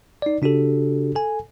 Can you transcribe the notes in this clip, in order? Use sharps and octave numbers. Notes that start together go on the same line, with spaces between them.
D#4 D5
C#3 D4 F#4 G4 A4
A4 G#5